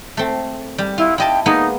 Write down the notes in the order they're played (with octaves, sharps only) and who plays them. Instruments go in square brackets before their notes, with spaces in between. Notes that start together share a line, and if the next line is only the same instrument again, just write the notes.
[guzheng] A3 C4
G3
[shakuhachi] E4 [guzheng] F4
[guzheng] E4 D#5 A5 [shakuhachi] G5
[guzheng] G#3 A#3 B3 [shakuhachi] D#4